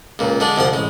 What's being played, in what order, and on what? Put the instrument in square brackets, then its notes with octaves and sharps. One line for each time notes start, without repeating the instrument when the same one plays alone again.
[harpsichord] C#2 A#2
D3 G#3 D4
C2 D3 F3 C6
A1 G#3